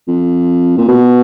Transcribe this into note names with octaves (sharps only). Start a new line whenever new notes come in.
F2
A#2
B2